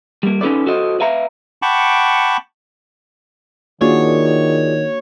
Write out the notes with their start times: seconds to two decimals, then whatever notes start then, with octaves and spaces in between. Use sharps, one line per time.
0.23 G3 A#3
0.41 C#4 D#4 A4 B4 D5
0.66 F#4 A4 C5 D#5
1.00 B4 E5 F5 A#5
1.62 F#5 G5 A5 B5 C#6 D6
3.81 D#3 A#3 D4 F4 F#4 G#4 C#5 D5